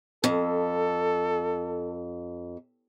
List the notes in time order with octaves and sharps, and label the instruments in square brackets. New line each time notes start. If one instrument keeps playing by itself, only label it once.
[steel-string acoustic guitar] F2 [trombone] A4